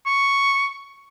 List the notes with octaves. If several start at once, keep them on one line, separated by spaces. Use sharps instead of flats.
C#6